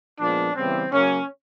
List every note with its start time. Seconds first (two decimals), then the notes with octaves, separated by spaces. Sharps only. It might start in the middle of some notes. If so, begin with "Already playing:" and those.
0.20 A#2 F3 G#3 B3 D4
0.55 C#3 E3 G3 B3 C4
0.91 C#3 F#3 A#3 C#4